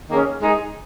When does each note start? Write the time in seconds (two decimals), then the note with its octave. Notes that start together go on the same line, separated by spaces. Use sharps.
0.09 D#3 A#3 C#4 G#4
0.39 G#3 D#4 G#4